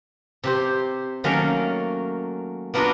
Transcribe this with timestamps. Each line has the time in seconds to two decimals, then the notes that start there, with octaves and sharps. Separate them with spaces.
0.44 C3 G4 C5
1.24 D#3 F#3 A3 A#3 C#4
2.74 A#3 B3 D4 F4 F#4 A#4